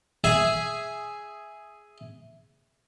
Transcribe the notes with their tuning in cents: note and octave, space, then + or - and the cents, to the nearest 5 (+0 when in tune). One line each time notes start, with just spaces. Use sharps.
G#4 +0 E5 +0 G#5 +0